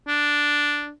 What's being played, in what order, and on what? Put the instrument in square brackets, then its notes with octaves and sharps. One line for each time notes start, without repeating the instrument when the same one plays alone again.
[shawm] D4